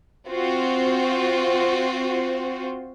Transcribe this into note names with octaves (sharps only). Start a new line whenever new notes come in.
C4 F4 F#4 C5